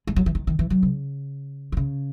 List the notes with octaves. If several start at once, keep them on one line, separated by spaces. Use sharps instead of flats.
G#3
F#3
E3
D#3
D#3
E3
F#3
C#3
D#3
C#3